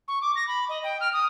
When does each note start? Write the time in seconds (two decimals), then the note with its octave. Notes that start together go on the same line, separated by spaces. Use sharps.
0.08 C#6
0.22 D6
0.36 A#6
0.48 B5
0.69 D#5
0.84 G5
1.01 F6
1.13 D#6